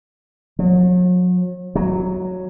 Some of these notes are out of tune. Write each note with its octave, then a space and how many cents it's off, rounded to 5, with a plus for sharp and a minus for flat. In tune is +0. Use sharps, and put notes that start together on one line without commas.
F#3 -40
F#3 -5